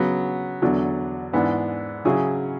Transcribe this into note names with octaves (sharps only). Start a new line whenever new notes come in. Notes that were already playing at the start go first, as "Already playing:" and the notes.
Already playing: C#3 F#3 B3
E2 D3 F#3
G#2 E3 B3 D4
C#3 F#3 C#4 E4 G#4